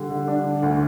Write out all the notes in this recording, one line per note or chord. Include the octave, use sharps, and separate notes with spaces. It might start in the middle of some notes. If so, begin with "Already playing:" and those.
Already playing: D3 G3
D3
D4
D3
D2